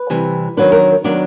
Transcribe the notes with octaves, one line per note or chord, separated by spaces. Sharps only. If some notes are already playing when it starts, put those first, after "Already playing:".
Already playing: B4
C3 E3 G3
D#3 F#3 B3 D4 B4
A#4
D#3 F#3 B3 D4 D5